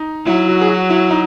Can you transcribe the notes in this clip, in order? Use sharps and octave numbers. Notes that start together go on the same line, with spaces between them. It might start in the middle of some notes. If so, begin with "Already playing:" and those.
Already playing: D#4
F#3 E4
F#4
G#4
F#4
E4
D#4